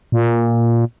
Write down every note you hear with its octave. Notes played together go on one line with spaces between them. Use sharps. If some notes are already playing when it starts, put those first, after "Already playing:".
A#2